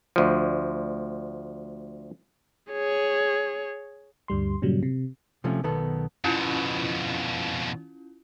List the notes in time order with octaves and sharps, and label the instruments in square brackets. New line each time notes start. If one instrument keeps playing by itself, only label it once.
[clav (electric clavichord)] D2 F3
[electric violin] G#4 C#5
[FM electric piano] D2 G2 G3 C6
G2 A#2 C#3 F#3 G3
C3
[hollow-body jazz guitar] C3 F3 A3 C#4
B1 D#3 B3 A4
[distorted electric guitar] F2 B2 [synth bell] C#4 E4 F4